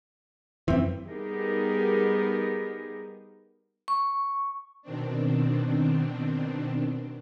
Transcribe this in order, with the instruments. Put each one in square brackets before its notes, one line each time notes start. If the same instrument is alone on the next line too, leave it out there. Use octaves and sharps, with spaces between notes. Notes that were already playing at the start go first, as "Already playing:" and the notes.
[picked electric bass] F#2 E3 [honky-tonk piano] C4 E5
[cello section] G3 B3 D#4 G4 G#4 A#4
[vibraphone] C#6
[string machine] B2 D#3 C4 D4